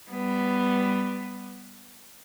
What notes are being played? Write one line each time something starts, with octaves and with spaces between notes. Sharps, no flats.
G3 B3